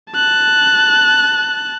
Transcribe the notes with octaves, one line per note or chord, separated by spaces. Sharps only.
A5 F#6